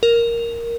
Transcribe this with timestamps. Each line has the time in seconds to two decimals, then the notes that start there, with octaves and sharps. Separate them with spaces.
0.03 A#4